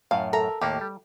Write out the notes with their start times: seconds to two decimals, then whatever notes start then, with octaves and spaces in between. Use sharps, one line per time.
0.11 F#2 A2 F5
0.33 A4 A#4 E5 A#5
0.61 D#2 A2 A#3 G4
0.81 G3